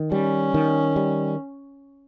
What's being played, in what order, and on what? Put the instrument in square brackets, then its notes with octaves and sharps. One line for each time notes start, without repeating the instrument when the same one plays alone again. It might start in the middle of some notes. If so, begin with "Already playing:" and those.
Already playing: [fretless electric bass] D#3
[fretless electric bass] G3 [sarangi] C#4
[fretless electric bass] D#3
G3